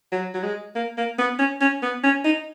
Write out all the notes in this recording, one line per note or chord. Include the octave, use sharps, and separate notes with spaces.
F#3
F#3
G#3
A#3
A#3
B3
C#4
C#4
B3
C#4
D#4